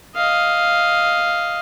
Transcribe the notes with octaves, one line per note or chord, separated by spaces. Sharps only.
D#5 F5